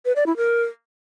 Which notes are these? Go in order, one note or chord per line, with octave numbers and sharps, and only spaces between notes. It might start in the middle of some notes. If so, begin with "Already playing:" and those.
B4
D5
E4
A#4